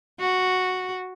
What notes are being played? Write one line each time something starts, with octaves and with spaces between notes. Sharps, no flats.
F#4